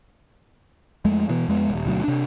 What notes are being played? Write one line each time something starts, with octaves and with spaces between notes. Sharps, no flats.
F2 G#3 A3
B2 E3 B3
F2 G#3 A3 B3
D#1 A#1
D2 B2 F#3
C3 D4